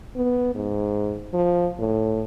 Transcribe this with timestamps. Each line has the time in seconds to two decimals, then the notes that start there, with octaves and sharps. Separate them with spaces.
0.16 B3
0.55 G#2
1.34 F3
1.79 A2